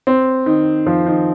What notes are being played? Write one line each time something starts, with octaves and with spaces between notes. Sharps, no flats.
C4
D#3
F3
D#3